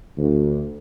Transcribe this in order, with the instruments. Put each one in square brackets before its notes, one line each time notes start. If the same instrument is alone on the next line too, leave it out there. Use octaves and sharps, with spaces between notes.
[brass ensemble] D2